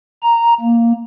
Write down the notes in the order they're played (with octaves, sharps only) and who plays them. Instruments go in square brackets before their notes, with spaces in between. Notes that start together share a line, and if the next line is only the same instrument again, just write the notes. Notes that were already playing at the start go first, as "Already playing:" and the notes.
[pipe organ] A#5
A#3